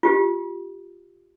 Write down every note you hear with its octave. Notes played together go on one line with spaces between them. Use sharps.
F4 G4